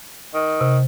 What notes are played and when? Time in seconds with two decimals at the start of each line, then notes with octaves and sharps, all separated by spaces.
0.34 D#3
0.61 C3